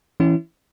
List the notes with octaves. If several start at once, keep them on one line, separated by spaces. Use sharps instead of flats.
E3 C#4 E4